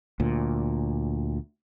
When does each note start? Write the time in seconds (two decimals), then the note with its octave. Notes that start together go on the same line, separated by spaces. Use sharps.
0.20 D2 A#2